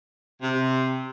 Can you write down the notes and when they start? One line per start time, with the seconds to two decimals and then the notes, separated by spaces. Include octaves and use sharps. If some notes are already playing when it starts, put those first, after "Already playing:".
0.41 C3